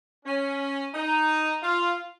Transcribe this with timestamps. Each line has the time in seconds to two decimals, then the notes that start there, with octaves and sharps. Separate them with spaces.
0.26 C#4
0.94 D#4
1.62 F4